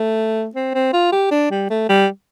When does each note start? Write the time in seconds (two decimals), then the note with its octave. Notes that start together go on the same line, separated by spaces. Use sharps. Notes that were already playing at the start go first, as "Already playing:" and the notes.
Already playing: A3
0.55 C4
0.75 C4
0.93 F4
1.12 G4
1.31 D4
1.51 G3
1.70 A3
1.89 G3